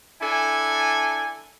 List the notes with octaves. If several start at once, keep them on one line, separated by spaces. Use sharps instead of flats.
D4 E4 A4 G#5